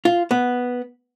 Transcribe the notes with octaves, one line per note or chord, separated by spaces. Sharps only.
F4
B3